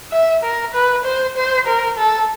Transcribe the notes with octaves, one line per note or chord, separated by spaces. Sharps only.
E5
A#4
B4
C5
C5
A#4
A4